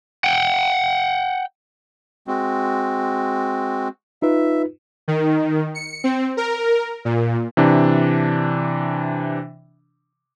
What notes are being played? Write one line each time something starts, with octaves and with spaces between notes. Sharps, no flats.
F#5 G5
G#3 C4 F#4
D#4 F4 B4 E5
D#3
C#7
C4
A#4
A#2
C3 E3 D4